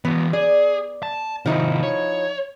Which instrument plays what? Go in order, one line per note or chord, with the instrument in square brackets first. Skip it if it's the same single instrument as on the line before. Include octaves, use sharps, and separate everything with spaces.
[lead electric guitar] E3 F#4 [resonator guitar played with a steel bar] B3
[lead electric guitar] G#4 [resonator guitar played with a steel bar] D5
[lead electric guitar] A5
[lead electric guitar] C3 D#3 [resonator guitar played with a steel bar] F3 D#4 E4
[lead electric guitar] C#5